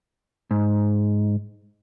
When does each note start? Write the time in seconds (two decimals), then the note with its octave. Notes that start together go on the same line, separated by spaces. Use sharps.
0.51 G#2